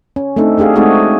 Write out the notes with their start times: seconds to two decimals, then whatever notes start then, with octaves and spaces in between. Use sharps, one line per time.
0.16 C#4
0.36 A3 C4 D4 D#4 A4
0.58 A3 D4 G4 G#4 F5
0.76 G#3 A3 C4 D#4 F#4 G#4